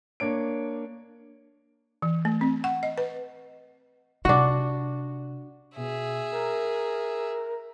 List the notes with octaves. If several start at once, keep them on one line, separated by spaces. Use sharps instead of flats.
A#3 D4 C#5 D7
E3
A3
C4
F#5
D#5
B4
C3 D4 F#4
B2 G#4 E5
A#4